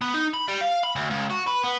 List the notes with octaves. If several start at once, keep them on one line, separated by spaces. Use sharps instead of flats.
B3
D#4
B5
G3
F5
B5
D2
C#2
F#4
B4
B3